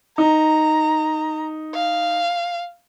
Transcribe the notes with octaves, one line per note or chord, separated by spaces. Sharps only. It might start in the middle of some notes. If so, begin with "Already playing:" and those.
D#4 A#5
F5